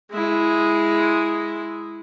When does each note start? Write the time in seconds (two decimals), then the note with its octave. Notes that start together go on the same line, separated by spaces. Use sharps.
0.11 G#3 E4